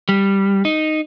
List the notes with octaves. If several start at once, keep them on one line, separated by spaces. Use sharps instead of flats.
G3
D#4